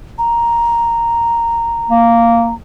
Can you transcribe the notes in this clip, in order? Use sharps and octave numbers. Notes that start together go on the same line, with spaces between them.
A#5
A#3